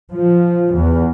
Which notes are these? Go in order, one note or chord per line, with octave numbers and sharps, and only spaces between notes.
F3
E2